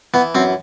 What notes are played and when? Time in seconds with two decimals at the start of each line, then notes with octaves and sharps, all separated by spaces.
0.14 E3 B3
0.35 F#2 C4